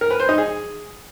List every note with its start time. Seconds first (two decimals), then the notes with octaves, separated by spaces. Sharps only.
0.01 A#4
0.10 B4
0.20 C5
0.29 D#4
0.38 G#4